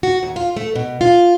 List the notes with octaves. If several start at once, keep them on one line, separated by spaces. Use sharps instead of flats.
F#4
D#2
F4
A3
B2
F4